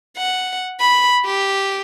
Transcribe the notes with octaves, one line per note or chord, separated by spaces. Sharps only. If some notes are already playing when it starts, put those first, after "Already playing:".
F#5
B5
G4